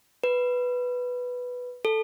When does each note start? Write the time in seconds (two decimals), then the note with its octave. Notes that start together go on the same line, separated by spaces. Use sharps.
0.24 B4
1.85 A4